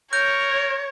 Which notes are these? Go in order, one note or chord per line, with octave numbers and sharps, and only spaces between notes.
A#4 C#5 G6